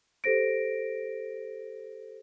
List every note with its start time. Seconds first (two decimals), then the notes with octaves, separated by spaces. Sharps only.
0.24 G4 A4 C5 A#6 D7